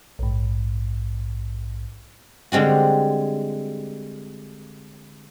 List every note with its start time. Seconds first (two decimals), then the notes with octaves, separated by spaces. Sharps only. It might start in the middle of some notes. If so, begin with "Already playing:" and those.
0.19 A#1 G#2
2.52 D3 G3 G#3 C4 F#4